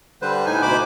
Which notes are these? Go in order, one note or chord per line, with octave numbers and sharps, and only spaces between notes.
D3 G3 B4 C5
A2 D#4 G#5
D2 B2 C5 B5 D6